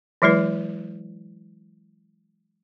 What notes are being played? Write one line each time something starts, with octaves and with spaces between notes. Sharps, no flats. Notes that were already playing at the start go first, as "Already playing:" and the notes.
E3 F#3 G#3 E4 B4